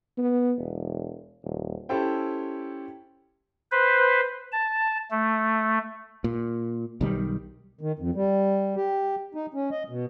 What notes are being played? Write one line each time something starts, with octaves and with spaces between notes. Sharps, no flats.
B3
E1
D#1
C#4 E4 G4 A4 C5 G5
B4 C5
A5
A3
A#2
B1 D#3 G3
D#3
F2
G3
G4
D#4
C#4
D#5
B2